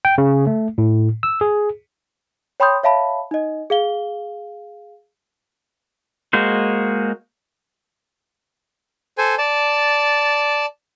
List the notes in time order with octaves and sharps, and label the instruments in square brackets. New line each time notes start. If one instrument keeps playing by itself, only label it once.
[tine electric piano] G5
C#3
A3
A2
E6
G#4
[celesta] C#5 G5 B5 C6 D#6 G6
C#5 E5 F5 A5 B5
D#4 D#5
G#4 F5 G7
[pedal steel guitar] G#3 A#3 F#4 C5
[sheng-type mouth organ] A4 C5 G#5
D5 A5